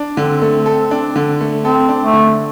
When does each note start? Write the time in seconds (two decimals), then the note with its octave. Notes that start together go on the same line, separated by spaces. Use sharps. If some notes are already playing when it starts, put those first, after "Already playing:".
Already playing: D4
0.17 D3 C4
0.42 A3
0.66 A4
0.91 D4
1.16 D3
1.41 A3
1.65 C4 A4
1.89 D4
2.01 A3
2.13 D3